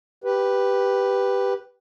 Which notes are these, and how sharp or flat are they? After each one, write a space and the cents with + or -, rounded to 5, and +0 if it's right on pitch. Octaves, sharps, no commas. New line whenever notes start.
G4 +0 B4 +0